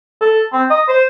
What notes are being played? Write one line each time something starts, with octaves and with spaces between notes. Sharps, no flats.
A4
C4
D#5
C5